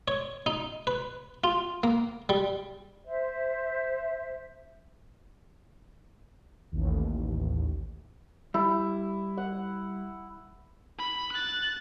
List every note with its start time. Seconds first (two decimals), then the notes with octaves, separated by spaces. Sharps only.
0.08 C#5
0.46 D#4
0.87 B4
1.44 F4
1.83 A#3
2.29 G3
3.05 C5 E5
6.72 A1 D#2
8.54 G3 E4
9.37 F#5
10.98 B5
11.32 F#6 A6